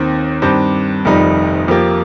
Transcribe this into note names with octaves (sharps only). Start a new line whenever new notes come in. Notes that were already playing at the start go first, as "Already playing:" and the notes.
Already playing: D#2 D#3 C4
G2 D#3 C4 G4
F1 F2 D#3 G3 D#4
F2 F3 A#3 G4